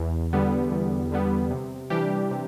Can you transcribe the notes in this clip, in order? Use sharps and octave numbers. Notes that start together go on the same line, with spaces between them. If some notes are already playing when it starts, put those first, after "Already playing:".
Already playing: E2
D3 G3 B3
E2
D3 G3 B3
C3
E3 G3 D4 G4
C3